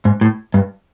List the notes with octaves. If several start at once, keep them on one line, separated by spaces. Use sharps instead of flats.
G#2
A2
G2